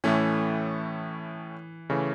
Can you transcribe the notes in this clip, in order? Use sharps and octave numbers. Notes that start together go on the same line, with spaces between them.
A2 E3 A3 C#4
C#3 E3 A3 C#4